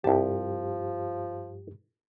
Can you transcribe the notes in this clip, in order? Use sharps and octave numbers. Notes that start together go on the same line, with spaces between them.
C2 G2 F3 G4 A5